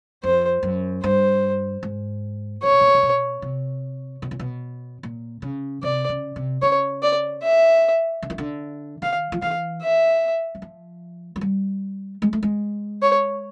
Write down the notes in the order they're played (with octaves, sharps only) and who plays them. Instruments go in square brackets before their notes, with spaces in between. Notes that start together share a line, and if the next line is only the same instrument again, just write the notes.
[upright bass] F2 [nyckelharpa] C5
[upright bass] F#2
[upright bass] G2 [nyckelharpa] C5
[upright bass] G#2
[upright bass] A#2 [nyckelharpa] C#5
[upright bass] B2
A#2
C3
B2
C3
B2
A#2
B2
A#2
C#3
[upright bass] C3 [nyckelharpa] D5
[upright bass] C#3
C3
[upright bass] C#3 [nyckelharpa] C#5
[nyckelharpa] D5
E5
[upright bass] D3
D#3
D3
[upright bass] D#3 [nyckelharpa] F5
[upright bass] F3
[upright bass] E3 [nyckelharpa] F5
[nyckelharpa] E5
[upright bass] F#3
F3
F#3
G3
G#3
A3
G#3
[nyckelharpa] C#5